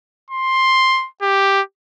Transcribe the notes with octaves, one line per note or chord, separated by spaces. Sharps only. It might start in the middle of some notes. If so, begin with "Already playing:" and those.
C6
G4